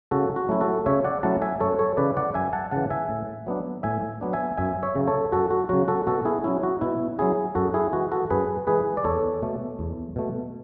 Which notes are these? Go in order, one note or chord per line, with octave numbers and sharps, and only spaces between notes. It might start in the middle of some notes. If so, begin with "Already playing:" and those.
C#3 F#4 A4
F#4
F#3 A3 C#4 E4
F#4 A4
C#3 C#5 E5
D5 F#5
F#3 A3 C#4 E4 F#5 A5
E5 G#5
F#2 A4 C#5
A4 C#5
C#3 E3 B4 D5
D5 F#5
F#2 E5 G#5
F#5 A5
C#3 E3 F#5 A5
E5 G#5
A2
F#3 B3 D4
A2 E5 G#5
F#3 B3 D4
E5 G#5
F#2 E5 G#5
C#5 E5
C#3 F#3
A4 C#5
F#2 F#4 A4
F#4
C#3 F#3 F#4
F#4 A4
B2 F#4 A4
E4 G#4
F#3 C#4 E4
F#4
B2 E4
F#3 C#4 E4 G#4
F#2 F#4 A4
E4 G#4
E3 G#3 F#4
F#4 A4
F#2 G#4 B4
E3 G#3 G#4 B4
D5
E2 A4 C#5
B2 A3
E2
B2 A3